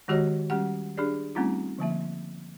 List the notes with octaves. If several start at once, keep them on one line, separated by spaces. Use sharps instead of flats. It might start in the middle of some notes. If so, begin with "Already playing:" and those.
D#3 G#3 F#4 G4 C#5 D#5
G3 C#4 G4 F#5
D4 G4 G#4 D5
G3 A3 C4 C#4 D#4 F4
D3 F3 A#3 E5